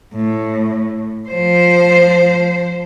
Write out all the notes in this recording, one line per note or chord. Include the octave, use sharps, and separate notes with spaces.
A2
F3 C5